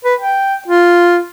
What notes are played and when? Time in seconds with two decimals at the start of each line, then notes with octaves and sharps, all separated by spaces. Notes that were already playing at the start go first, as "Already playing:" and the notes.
0.04 B4
0.20 G5
0.68 F4